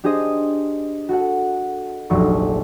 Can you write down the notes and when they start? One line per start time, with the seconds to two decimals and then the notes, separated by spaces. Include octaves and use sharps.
0.04 D4 G4 G#4 C5 D#5
1.09 F#4 A4 F#5
2.10 F1 A#1 F#3 A4 C#6